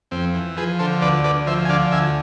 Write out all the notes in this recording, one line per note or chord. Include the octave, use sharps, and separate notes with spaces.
F2 C4
E3
F3 G#4 B4
D3 A4 C5
D2 B4 D5
D2 B4 D5
F3 C5 E5
G#5
D3 D5 F5
D2 E5 G#5